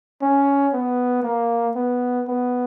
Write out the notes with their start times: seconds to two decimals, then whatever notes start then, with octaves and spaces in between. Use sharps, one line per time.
0.22 C#4
0.73 B3
1.24 A#3
1.76 B3
2.28 B3